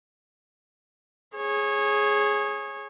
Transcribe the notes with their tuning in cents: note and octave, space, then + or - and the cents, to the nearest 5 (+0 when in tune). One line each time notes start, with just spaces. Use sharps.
G#4 +5 C#5 -20